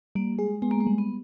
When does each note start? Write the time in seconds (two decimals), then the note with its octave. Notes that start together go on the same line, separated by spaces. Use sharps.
0.15 G3 A#3
0.38 G#3 G#4
0.62 G#3 B3
0.71 A#3
0.81 G#3
0.87 G3
0.98 B3